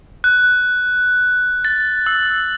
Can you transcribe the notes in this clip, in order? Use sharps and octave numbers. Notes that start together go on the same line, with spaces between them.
F#6
A6
E6